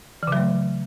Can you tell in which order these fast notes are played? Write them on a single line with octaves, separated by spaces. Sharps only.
E3 C#3 F#3 A3